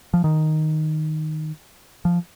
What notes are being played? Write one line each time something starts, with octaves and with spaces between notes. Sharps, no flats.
F3
D#3
F3